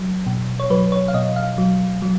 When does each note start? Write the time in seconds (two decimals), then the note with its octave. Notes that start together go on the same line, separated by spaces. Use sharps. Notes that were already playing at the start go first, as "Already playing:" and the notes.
Already playing: F#3
0.27 B2
0.60 C#5
0.70 F#3 B4
0.92 C#5
1.08 F5
1.14 B2 D#5
1.36 F5
1.58 F#3
2.02 F#3